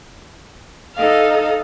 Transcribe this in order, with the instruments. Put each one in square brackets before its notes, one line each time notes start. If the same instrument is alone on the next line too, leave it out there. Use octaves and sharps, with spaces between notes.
[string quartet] D#4 A4 D#5 F5